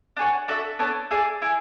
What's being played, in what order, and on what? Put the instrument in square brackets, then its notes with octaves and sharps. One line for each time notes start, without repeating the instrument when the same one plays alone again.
[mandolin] D4 G#4 C#5 F#5
D4 F#4 A4 E5
B3 D4 A4 C#5
E4 G#4 D5
E4 G#4